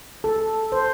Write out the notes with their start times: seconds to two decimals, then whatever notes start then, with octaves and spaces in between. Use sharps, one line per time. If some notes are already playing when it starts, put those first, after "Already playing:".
0.24 A4
0.72 C5